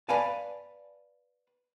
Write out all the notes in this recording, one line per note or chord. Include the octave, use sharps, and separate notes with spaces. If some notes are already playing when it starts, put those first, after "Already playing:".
B4 D5 F5 G#5 A5